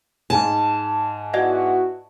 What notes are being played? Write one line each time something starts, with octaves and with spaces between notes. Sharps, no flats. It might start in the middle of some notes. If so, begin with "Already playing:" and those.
G#2 G#5 A5
B3 E4 F#4 D5 D#5 F5